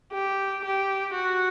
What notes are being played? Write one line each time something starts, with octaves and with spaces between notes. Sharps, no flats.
G4
G4
F#4